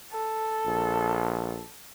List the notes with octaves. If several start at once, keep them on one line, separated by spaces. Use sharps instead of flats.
A4
A#1